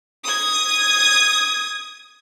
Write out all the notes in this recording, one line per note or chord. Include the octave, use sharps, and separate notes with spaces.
D#6 G#6